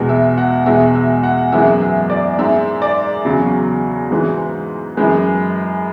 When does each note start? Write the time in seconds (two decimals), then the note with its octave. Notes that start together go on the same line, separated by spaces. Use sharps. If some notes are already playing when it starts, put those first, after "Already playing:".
Already playing: E2 B2 G#3
0.09 E5
0.38 F#5
0.66 E2 B2 G#3 E5
0.95 E5
1.23 F#5
1.52 F#2 E3 G#3 E5
1.82 E5
2.10 D5
2.39 G#2 G#3 E5
2.82 D5
3.25 E2 C#3 F#3
4.11 G#2 E3 G#3
4.97 F#2 E3 G#3 B4